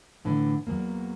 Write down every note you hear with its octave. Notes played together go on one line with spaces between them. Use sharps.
A2 D3 E3
E2 F3 F#3 A#3